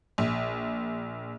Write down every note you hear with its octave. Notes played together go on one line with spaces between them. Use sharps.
A#1